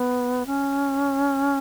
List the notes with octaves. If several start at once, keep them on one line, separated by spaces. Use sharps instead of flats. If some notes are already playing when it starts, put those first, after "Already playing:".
Already playing: B3
C#4